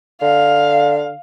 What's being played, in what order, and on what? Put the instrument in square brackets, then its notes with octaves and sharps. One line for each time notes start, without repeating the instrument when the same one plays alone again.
[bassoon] D3 [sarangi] F5